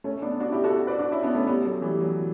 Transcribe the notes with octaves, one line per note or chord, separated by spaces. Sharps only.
A3 C#4
B3 D4
D4 F#4
E4 G4
F#4 A4
B4 D5
D4 F#4
C#4 E4
B3 D4
A3 C#4
G3 B3
F#3 A3
E3 G3
F#3